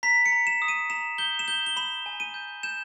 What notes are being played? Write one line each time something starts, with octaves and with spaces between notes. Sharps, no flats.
A#5 B6
C#7
A#5
E7
D#6
D#7
A#5 E7
G6 G7
E7
G6 G7
G7
B5 E7
G#5
D#7
G6
G6 E7